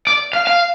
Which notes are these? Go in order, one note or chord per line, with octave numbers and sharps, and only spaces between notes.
D5
F5
F5